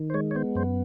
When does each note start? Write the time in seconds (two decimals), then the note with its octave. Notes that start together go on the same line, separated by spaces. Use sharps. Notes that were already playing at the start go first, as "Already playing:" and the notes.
Already playing: D#3
0.10 C5
0.14 G#3 C#5
0.31 C#5
0.35 B3 C5
0.55 F#2 C5